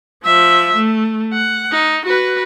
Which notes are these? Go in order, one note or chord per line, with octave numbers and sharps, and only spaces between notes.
F3 E5
A3
F#5
D#4
F#4 B4